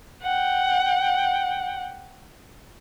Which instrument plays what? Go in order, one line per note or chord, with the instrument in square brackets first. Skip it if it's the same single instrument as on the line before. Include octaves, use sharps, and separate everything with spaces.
[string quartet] F#5 G5